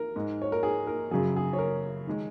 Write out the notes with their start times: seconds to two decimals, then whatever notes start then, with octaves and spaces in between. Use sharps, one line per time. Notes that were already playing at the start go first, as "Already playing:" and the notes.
Already playing: A#4
0.16 G#2 G#3
0.42 C#5
0.52 A#4
0.63 G#4
0.87 A#4
1.11 F#2 C#3 F#3 G#4
1.36 G#4
1.53 C#5
1.59 A#4
2.07 D#3 G#3